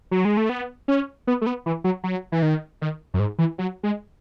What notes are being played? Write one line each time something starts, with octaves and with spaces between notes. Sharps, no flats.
F#3
G#3
A3
B3
C#4
B3
A3
B3
E3
F#3
F#3
E3
D#3
D#3
F#2
G#2
E3
F#3
G#3